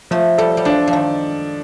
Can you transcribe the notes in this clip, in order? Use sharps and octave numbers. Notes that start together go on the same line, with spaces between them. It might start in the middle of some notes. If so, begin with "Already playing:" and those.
F3 A3
G3 A4
G3
F3 D4
F3
D#3